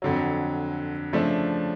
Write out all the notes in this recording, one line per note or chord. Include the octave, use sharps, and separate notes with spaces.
F2 D3 F#3
C#3 F3 A3 D4